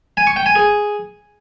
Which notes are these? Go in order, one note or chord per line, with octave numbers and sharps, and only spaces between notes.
G#5
C#6
G5
G#5
G#4